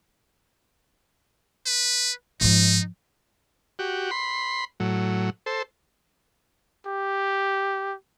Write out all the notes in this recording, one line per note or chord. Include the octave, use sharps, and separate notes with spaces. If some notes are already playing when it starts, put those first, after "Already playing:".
B4
G#2 F3 D#4
F#4 G4
B5 C6
A2 F#3
A4 C5
G4